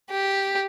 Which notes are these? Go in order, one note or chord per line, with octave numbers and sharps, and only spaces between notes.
G4